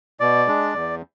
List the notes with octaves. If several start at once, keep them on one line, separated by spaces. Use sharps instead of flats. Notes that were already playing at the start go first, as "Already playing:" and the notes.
B2 D5
G#3 D4
E2